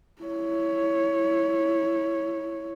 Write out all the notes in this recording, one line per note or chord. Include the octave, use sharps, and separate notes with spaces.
E4 C#5